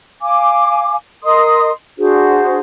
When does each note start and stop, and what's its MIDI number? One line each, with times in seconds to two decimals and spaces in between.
0.21 0.95 77
0.21 0.95 80
0.21 0.95 86
1.23 1.71 70
1.23 1.71 75
1.23 1.71 84
1.23 1.71 87
1.99 2.59 62
1.99 2.59 66
1.99 2.59 68
1.99 2.59 72